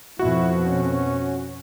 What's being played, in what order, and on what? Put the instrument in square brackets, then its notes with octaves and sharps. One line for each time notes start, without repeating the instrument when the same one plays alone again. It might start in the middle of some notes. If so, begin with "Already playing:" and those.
[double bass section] F2 B2 [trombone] E4 [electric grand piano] F#4
[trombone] C#4